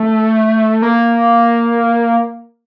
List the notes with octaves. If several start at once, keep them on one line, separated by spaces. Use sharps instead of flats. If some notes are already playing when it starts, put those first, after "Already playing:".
Already playing: A3
A#3